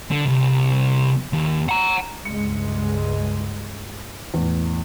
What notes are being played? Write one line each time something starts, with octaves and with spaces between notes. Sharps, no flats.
D3
C2
D#2
F#5 A#5
C#2 G2 G#3 C#7
E2 A2